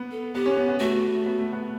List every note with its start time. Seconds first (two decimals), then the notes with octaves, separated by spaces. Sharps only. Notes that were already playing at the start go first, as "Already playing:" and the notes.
Already playing: B3
0.11 A4
0.34 B3 G4
0.46 C#4
0.57 B3
0.69 B3
0.80 A3 F#4
1.26 B3
1.39 A3
1.53 B3